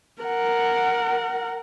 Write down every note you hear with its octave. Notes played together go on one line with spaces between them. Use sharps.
A#4 F#5